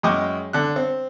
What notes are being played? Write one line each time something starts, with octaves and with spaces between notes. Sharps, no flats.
F#2 G#3 D#5 G5 C#6 D6
D3 F#6
C4